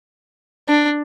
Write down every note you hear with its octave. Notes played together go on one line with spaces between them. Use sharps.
D4